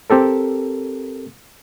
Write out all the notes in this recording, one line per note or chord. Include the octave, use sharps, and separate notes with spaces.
C4 G4 A4 A#4